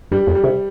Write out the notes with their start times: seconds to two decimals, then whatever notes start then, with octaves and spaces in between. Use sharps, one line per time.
0.11 G2 G3
0.27 F2
0.35 G3
0.43 C3